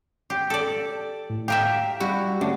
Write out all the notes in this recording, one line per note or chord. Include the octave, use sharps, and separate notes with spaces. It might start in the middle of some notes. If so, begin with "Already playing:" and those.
G4
A4 D5
A2
G4 A#4 E5 F5 G5
G3 E4 F#4 G4
D3 A3 C#4 D5